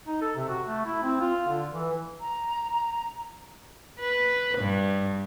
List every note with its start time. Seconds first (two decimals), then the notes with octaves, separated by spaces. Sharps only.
0.07 D#4
0.22 A4
0.36 C3
0.49 F#4
0.66 A3
0.86 E4
1.03 C4
1.21 F4
1.48 D3
1.71 E3
2.21 A#5
4.00 B4
4.58 G2